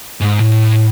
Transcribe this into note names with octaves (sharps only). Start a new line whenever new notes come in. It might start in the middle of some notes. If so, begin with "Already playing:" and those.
G#2
A2